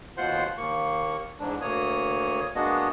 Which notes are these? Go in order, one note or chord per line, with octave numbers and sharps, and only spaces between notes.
D#2 B2 F4 C5 F#5 C6
D#2 A#3 C#6
E2 G#2 D4
D2 A#3 C#5 D#6
G#3 A#3 B3 D4 F#4 D#5